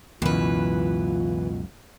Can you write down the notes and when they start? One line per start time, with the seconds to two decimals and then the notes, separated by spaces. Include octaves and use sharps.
0.22 C#2 F#2 B2 E3 F4 B4